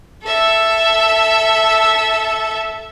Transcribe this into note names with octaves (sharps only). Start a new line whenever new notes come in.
A4 E5